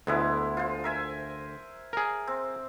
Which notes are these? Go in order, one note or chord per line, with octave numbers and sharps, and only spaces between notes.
D2 G#3 B3 E4
F4 C5
A#4 E5 G#5
G#4 A#4
C4